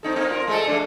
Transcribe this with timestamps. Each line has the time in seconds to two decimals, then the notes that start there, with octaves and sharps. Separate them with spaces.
0.03 C4 D#4 A4
0.16 A#3 C4 D#4
0.28 C4 F4 A#4
0.47 G#3 A3 A4
0.67 F3 A3 D4